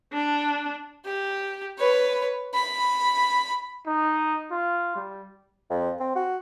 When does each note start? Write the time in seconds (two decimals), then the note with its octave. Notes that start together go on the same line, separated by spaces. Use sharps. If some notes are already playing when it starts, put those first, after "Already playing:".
0.12 D4
1.05 G4
1.78 B4 C#5
2.54 B5
3.86 D#4
4.51 F4
4.95 G3
5.70 F2
6.00 C4
6.15 F#4